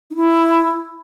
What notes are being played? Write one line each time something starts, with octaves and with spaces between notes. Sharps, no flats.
D#4
E4